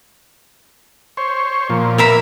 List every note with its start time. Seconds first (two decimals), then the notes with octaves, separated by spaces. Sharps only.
1.17 C5 C#5
1.70 A#2 F3
1.98 A#4 E5 B5